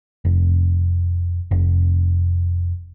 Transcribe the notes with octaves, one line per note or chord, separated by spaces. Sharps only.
F1
F1